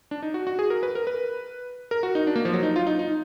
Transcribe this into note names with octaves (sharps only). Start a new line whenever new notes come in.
D4
D#4
F#4
F#4
G#4
A#4
B4
A#4
B4
A#4
F#4
D#4
D4
A#3
F3
F#3
D#4
F4
D#4
D#4